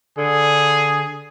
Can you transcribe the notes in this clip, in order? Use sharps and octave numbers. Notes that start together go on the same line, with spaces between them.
D3 G#4